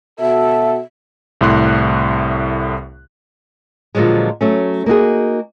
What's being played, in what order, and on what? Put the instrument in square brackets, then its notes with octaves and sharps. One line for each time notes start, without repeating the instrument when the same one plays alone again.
[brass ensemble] B2 F#4 A4 [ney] E5
[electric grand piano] C2 A2 C6 F#6
[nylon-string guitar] A#2 D3 F3 F#3 G#3
F#3 A3 C#4
A#3 D#4 F#4 G#4